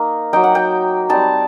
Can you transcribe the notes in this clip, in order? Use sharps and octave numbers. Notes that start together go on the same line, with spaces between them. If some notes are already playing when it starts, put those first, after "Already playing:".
Already playing: A#3 D#4
F#3 A#3 D#4 G5
F#5
G5
G3 C4 D#4 A5